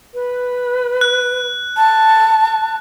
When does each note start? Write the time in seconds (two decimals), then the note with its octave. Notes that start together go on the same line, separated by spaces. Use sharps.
0.14 B4
1.01 F#6
1.76 A5